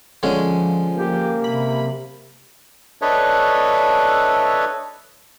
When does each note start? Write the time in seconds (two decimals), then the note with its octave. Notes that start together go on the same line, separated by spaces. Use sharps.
0.23 D3 F3 G#3 C#4
0.97 A#3 G4
1.44 C3 B5
3.02 D4 A4 B4 C#5 D#5 E5